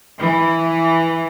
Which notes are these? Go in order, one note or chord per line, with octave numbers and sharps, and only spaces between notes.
E3